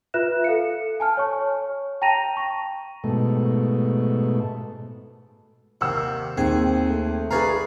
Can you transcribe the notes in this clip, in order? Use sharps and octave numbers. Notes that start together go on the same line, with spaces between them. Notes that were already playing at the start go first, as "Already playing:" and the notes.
F4 B4 E5 F#6 E7
A4 F5 C#7
G#5 A5 F6
C#5 C#6
G5 A5 A#5 A#6 D#7 F7
C#6
G#2 B2 A3
D#2 C3 F#5 E6
D#2 C4 G#4
A3
G#4 B4 C#5 D5 F5 A#5